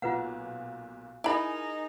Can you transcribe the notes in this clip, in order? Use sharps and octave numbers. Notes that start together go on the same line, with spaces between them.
B1 A#2 F4 B4 F#5
D#4 E4 G#4 A#4 G#5 B5